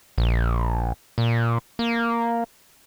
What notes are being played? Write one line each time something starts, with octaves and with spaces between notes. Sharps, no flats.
A#1
A#2
A#3